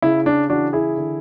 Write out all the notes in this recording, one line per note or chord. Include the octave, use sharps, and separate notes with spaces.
C#3 E4
D4
E3 D4 F#4
E4 G#4
D3